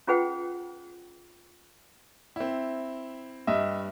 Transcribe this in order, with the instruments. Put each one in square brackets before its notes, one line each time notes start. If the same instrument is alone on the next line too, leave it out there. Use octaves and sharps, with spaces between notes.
[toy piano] C#4 F4 G#4 B4 F#5 G5
[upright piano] C4 E4
[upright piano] G2 G3 [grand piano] D#5 E5